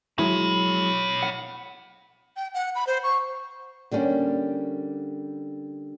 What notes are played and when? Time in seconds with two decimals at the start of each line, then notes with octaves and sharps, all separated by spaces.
0.19 F#3 G#3 E4 C#5 B5
1.23 F#5
2.37 G5
2.54 F#5
2.75 B5
2.87 C5
3.03 C#6
3.91 D3 G3 A#3 C#4